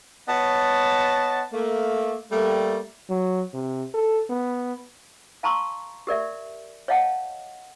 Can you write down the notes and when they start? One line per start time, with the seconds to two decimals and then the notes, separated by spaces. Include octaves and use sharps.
0.28 B3 C#5 D#5 F#5 A5
1.53 A3 A#3
2.31 G3 A3 A#3
3.10 F#3
3.54 C3
3.94 A4
4.30 B3
5.43 F5 A5 A#5 C6 C#6 E6
6.07 G4 A#4 D5 E5
6.88 C#5 D#5 F5 F#5 A5